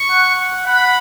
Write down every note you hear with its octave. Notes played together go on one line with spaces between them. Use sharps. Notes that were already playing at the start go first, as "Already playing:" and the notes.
Already playing: C#6
F#5
F#5 B5